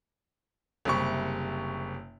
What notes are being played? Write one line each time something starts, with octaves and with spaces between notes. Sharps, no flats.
F#1 C3 G3 C#6